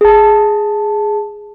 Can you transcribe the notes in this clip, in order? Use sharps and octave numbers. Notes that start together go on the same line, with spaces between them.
G#4 A5